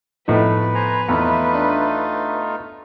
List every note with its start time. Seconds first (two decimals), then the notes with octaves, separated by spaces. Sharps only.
0.28 A2 F3 A3 B3 D#4 B4
0.75 C5 G#5 A#5
1.09 E2 A3 D#4 F4
1.55 D4